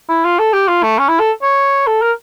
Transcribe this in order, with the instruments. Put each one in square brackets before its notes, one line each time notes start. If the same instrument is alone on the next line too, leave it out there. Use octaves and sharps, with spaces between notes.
[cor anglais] E4
F4
A4
G4
F4
A3
C#4
E4
A4
C#5
A4
A#4